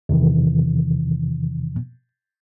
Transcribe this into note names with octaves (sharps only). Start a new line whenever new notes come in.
E2 C3 D#3 E3